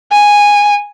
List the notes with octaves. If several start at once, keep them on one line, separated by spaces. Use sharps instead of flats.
G#5